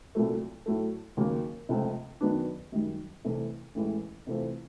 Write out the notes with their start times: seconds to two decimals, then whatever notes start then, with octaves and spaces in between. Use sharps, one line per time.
0.15 C2 A#2 F#3 A3
0.66 A2 F#3 A3
1.17 D#2 C#3 F#3 A#3
1.69 C#2 C3 F3 A3 C4
2.21 F#2 D#3 F#3 B3 D4
2.72 F#2 D#3 G3
3.24 C2 C3 E3 A3
3.75 A1 A2 E3 G#3
4.27 C3 E3 A3 C4 F4